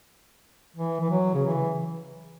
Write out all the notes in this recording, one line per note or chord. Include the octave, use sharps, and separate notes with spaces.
E3
E3
F#3
C#3
E3